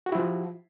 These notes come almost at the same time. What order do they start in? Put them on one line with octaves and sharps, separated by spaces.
F#4 G4 E4 F3